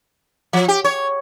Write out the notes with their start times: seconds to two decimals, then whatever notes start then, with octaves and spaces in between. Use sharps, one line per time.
0.53 F3
0.68 G4
0.84 C#5